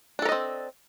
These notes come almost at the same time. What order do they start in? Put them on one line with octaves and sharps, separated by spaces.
D4 A4 A#4 D#5 C4